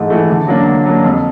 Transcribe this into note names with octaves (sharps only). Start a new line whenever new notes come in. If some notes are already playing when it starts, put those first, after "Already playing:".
Already playing: G#2 E3 A3
E3 A3
D3
F#3 A#3 D4
D3
F#3 A#3 D4
F2